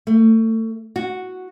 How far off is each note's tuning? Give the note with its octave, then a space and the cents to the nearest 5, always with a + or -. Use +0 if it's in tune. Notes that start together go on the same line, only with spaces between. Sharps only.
A3 +30
F#4 -5